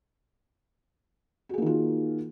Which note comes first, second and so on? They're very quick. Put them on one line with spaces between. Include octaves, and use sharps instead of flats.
F#4 G#4 A#3 D#3 F4